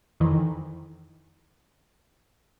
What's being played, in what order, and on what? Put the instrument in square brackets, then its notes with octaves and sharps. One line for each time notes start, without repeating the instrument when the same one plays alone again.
[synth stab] F2 D#3 E3